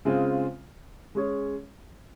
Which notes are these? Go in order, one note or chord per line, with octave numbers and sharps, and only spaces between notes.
C#3 G#3 C4 F4
G#3 C#4 G#4 C#5